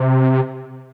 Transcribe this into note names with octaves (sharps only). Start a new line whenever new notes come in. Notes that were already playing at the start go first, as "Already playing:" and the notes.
Already playing: C3